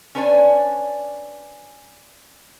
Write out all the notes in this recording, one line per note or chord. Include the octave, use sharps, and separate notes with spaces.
C#4 D4 B4 C#5 D5 G#5